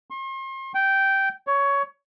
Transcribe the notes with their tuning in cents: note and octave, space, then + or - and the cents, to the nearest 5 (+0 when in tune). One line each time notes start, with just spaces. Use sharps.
C6 +40
G5 -10
C#5 +15